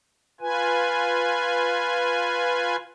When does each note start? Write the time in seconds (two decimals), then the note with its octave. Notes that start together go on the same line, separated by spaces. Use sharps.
0.41 F4 B4 G#5